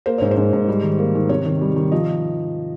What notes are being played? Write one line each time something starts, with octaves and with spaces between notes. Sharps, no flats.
A#3 C5
G#2 C#5
C5
G#2
G#2
G3
D#3
A#3
D#3
C3 C#5
D#3
G3
D#3
F3 D#5